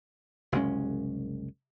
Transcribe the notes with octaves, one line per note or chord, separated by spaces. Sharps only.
F#1 C2 G#3 C#4